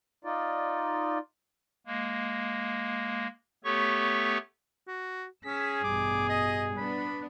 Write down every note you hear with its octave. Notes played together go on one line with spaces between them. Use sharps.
D#4 F4 D5
G#3 A#3
A3 B3 G4 A4 C#5 C#6
F#4
C#4 G#4 E6 B6
A1 G2 B2 D6
D#5
B3 D4 B5